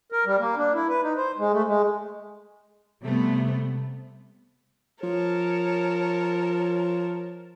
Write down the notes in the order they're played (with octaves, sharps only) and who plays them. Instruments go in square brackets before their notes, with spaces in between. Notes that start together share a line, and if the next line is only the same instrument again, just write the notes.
[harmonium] A#4
G3
A#3
D4
E4
B4
D#4
C5
G#3
A3
G#3
[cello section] C3 G3 A3 B3
[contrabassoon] F3 [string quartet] A#4 C#5 A5